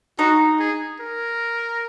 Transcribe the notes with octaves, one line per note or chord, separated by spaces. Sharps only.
D#4 F#4
G#4
A#4